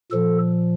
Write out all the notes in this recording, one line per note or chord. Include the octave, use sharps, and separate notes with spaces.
A#2 F3 A4